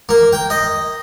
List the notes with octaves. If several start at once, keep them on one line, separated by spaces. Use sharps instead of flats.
A#3
G5
D#5